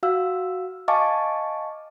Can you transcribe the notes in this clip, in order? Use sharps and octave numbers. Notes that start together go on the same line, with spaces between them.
F#4 F5 E6
D#5 F5 G#5 A5 C#6 D6